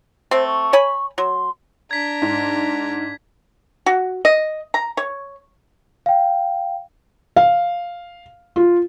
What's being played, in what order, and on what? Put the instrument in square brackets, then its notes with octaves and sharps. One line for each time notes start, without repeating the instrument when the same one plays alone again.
[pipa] A3 C4 [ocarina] C5
[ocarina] C#6
[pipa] C#5 G#5 B5
[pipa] F#3 [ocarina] C6
[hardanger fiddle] D4 A#5 [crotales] G#6 B6
[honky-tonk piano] G#2
[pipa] F#4
D#5
A#5
C#5
[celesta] F5 G5
[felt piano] F5
F4